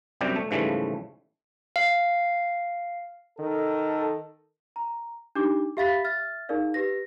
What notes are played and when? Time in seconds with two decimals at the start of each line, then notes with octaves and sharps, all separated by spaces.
0.21 F#2 C3 G3 D4 G5
0.36 A3
0.51 G#2 C#3 E3 F3 G3 A3
1.76 F5
3.39 D#3 A4
4.76 A#5
5.35 D4 D#4 G4 D6
5.77 G4 E5 F5 B5 A6 B6
6.04 E5 F6 A6
6.49 D#4 G#4 A#4 D5 F5
6.74 G4 B4 A#6